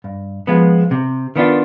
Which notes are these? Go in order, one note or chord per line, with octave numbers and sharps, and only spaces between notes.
G2
F3 G#3 B3 F4
C3
D#3 B3 D4 F4